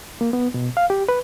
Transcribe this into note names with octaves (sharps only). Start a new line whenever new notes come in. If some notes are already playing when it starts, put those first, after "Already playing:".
A#3
B3
B2
F5
G4
B4